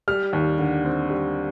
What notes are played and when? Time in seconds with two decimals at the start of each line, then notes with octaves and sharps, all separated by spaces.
0.08 G3 F6
0.33 D#2
0.59 D3
0.85 C4
1.10 G3